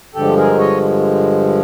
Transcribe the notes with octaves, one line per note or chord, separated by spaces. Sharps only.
G2 D3 F3 G#3 G4 A4
G#4 A#4
C#5 D#5